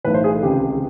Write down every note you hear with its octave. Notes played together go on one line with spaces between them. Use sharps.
B1 A2 E3 B4
C5
G#4
A4
C#2 C3 D#3 G4